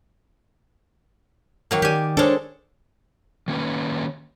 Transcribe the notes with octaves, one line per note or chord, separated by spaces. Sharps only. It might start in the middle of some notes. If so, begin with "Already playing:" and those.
D#3 F#3 A#3
D#3 G4 D5 G#5
G#3 D4 A4 C5 C#5
D#3 A#3 C#4 B4